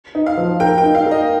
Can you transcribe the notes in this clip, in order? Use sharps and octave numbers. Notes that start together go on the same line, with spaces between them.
D#4
F5
F3
A#4 G5
G5
D#4
F5
A#4
D#5